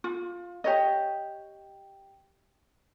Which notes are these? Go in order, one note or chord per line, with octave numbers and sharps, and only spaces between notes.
F4
G4 C#5 D#5